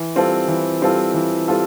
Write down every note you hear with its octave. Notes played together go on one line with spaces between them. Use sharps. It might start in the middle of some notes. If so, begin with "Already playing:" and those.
Already playing: E3
G3 C4 F4 A4
E3
G3 C4 F4 A4
E3
G3 C4 F4 A4